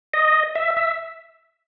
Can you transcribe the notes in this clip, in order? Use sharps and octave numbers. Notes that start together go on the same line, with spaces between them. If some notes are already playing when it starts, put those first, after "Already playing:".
D#5
E5
E5